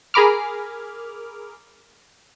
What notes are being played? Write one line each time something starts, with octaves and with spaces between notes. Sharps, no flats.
G#4 A#4 B5 D6 F6